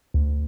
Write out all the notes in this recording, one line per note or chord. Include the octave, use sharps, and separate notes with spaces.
D2